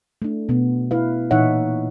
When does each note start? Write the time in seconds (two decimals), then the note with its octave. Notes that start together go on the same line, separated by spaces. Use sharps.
0.22 A3 D4
0.49 B2 B3
0.91 E4 B4 F5
1.31 A#2 E3 D#4 C#5 E5 F#5